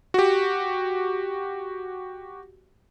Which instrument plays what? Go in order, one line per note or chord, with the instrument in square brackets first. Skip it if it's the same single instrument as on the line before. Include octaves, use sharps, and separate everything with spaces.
[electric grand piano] F#4 G4